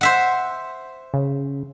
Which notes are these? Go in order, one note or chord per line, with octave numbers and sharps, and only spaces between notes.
C5 E5 F#5
C#3